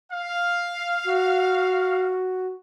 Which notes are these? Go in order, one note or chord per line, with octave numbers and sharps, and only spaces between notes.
F5
F#4